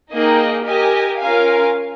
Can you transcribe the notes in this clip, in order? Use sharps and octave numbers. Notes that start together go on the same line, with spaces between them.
A#3 D#4 G#4 D#5 G5
G4 A#4 D#5 G#5
C#4 F4 A#4 F5 G#5